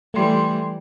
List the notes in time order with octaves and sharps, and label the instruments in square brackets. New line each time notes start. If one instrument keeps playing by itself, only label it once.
[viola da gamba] E3 G3 [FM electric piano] A3 C6